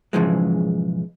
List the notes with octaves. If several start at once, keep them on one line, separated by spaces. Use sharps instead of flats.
B1 G#2 C#3 E3 F3 G#3